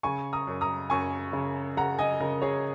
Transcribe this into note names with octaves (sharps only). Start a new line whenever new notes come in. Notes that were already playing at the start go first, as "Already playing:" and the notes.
C#3 G#5 C#6
A#5 D#6
F#2
A#5 D#6
F#2 G#5 C#6
C#3
C#3 F#5 A#5
D#5 G#5
C#3 A#4
G#4 C#5